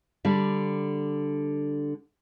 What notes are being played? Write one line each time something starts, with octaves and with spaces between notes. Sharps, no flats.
D3 G3